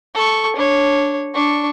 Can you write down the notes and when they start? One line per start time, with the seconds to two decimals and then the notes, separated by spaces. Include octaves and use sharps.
0.15 A4 C#6
0.56 D4 C#5
1.34 D4 C#6